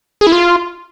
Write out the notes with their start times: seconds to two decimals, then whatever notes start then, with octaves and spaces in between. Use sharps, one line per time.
0.21 G#4
0.27 E4
0.32 F4